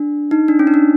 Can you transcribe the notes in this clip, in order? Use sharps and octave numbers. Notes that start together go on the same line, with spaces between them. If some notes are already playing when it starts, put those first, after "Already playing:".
Already playing: D4
D#4
D4
C#4
D#4
D4